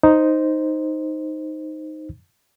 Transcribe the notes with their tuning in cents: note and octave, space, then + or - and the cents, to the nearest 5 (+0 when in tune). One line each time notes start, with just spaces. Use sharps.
D#4 +0 C5 +0